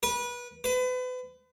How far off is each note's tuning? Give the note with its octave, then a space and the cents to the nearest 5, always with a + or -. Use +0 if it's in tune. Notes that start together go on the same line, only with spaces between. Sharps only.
B4 -25
B4 +35